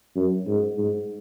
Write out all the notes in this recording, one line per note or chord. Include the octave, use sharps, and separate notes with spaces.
F#2
G#2
G#2